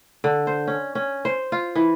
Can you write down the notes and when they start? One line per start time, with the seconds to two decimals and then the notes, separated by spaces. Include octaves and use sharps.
0.24 D3
0.47 C5
0.68 C#4
0.95 C#4
1.25 C5
1.52 F4
1.75 E3